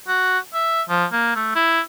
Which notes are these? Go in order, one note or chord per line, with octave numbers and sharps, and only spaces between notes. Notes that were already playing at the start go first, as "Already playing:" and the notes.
F#4
E5
F3
A#3
A3
E4